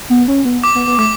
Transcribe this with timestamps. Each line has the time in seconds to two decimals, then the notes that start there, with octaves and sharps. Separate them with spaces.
0.10 B3
0.28 C#4
0.45 B3
0.64 D6
0.75 B3
0.87 B3
0.98 A3 D6